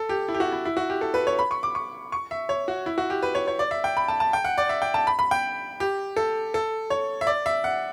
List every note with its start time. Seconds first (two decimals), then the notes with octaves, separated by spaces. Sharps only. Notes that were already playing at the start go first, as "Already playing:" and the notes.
Already playing: A4
0.09 G4
0.28 E4
0.34 G4
0.40 F#4
0.52 E4
0.65 E4
0.77 F#4
0.90 G4
1.01 A4
1.14 B4
1.27 C#5
1.39 B5
1.51 C#6
1.63 D6
1.75 C#6
2.12 C#6
2.31 E5
2.49 C#5
2.68 F#4
2.86 E4
2.98 F#4
3.10 G4
3.23 B4
3.35 C#5
3.47 C#5
3.59 D5
3.71 E5
3.84 G5
3.97 B5
4.08 A5
4.20 A5
4.33 G5
4.45 F#5
4.58 D5
4.69 E5
4.82 G5
4.94 A5
5.07 B5
5.19 B5
5.31 G5
5.80 G4
6.17 A4
6.54 A4
6.90 C#5
7.21 E5
7.27 D5
7.46 E5
7.64 F#5